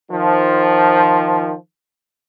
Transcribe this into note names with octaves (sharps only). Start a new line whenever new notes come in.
D#3 F3